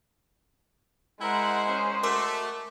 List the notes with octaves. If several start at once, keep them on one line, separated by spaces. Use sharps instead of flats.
G#3 E4 A#4 C5 F#5
C#4
A3 F#4 A#4 C6 D6